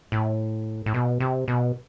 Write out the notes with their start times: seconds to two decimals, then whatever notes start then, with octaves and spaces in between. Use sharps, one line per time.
0.12 A2
0.86 A2
0.94 B2
1.20 C3
1.48 B2